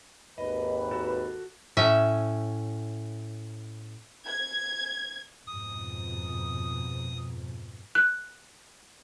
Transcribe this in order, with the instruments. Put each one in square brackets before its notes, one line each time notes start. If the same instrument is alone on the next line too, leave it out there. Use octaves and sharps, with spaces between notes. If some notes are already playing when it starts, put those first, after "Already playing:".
[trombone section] G#1 D#2 B4 [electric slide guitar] D#5
[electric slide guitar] F#4 A4
[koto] A2 C#4 E5
[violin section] G#6
[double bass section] F2 G#2 B2 [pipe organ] D#6
[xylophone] F#6